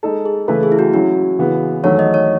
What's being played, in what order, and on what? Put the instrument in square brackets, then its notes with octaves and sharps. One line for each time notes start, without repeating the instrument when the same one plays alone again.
[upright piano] G#3 D#4 A4
[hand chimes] G#4
[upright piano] C#3 E3 A3 E4 B4 [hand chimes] A4
[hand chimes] G#4
E4
F#4
[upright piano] F#3 C#4 E4 [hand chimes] F#4
[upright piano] C#3 E3 B3
[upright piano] E2 D#3 F#3 A3 E4 [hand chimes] C#5
[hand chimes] D#5
C#5